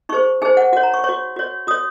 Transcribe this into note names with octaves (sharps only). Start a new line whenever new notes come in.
D#4 G#4 C5 C#6
D#4 G#4 C5 G#5
F#5
F#4 C#5 F#5
A#5
C#6
F#4 C#5 C#6
F#4 C#5
F#4 C#5 D#6